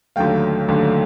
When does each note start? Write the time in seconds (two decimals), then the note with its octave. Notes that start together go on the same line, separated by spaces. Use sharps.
0.16 D#2 D3 F#3 A3 F5 G5
0.68 D#2 D3 F#3 A3